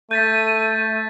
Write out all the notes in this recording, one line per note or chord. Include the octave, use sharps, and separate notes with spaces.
A3 G6 A6 B6 D#7